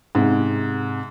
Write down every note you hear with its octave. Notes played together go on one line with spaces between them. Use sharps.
G#2 C3